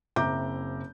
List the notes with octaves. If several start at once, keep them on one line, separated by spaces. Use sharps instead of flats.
F#1 C4 E5 A#5 D6 G6